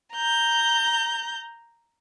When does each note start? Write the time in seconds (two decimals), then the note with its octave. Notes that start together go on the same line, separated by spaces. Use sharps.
0.13 A#5 G6